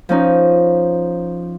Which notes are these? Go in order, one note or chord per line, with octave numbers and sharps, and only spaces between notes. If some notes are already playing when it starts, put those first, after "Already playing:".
F3 C#4 D#4